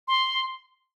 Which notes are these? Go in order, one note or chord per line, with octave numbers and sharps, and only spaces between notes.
C6